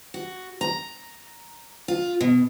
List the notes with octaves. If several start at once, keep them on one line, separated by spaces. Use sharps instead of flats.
F#4
A#5
F4
B2